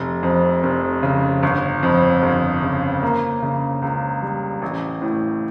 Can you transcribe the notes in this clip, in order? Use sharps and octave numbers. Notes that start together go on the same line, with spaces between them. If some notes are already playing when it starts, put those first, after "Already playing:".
Already playing: F1
F2
F1
C#3
G1
F2
G1
C#3
A#3
C#3
C#2
G3
A1
A2